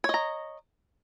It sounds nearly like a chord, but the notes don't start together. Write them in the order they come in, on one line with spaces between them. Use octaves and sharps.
C#5 D#5 A#5